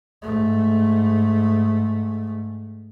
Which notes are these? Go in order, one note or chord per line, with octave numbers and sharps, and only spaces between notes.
G#2 A3